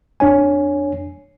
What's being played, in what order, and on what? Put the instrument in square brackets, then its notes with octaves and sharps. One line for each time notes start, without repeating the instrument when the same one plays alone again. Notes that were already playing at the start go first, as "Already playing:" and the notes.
[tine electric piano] F2 D4 C#5 G#5